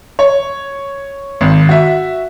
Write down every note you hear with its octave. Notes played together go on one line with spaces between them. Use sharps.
C#5
G#1
F#4 E5